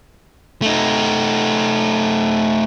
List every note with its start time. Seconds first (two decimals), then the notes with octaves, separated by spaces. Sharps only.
0.62 A3 D#4